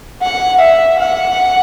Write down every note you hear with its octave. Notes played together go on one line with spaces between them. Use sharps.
F#5
E5
F#5